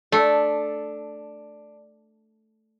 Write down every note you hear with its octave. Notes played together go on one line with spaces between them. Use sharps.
A3 D4